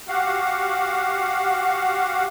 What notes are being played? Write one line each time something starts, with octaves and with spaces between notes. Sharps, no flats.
F#4 G4 F5 F#5